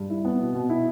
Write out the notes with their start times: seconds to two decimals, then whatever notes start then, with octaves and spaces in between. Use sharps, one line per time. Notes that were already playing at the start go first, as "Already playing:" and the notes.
Already playing: G2
0.10 E4
0.25 B3
0.39 B2
0.55 B2
0.69 E4